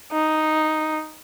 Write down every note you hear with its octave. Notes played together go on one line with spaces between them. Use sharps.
D#4